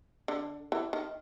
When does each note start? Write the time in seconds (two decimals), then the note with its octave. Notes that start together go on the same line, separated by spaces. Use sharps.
0.28 D3
0.72 E3
0.93 D#3